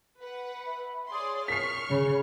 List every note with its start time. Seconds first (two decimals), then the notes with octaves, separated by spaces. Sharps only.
0.21 B4 F#5
0.66 E5 B5
1.11 G#4 C#5 D5 C6 D#6
1.48 A#4 C#6 F6 B6 C7
1.89 C#3 B5